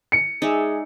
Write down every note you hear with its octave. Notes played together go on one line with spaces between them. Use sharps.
C#7
G#3 D#4 G#4 D5 E5